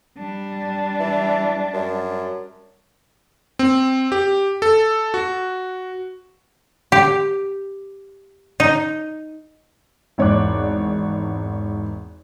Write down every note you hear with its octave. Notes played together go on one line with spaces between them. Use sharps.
G3 D4
E3
F#2
C4
G4
A4
F#4
G4
D#4
G#1 E2 C#5 D5 D6 F#6